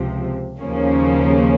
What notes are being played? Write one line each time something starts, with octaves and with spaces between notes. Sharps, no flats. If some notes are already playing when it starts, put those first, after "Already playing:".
Already playing: C#2 C3 F3
D#2 C#3 F3 A#3 C#4